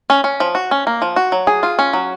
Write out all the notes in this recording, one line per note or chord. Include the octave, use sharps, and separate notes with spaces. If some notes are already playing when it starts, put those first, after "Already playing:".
C#4
C#4
F3
F#4
C#4
A#3
F3
F#4
F#3
G#4
F4
C#4
F#3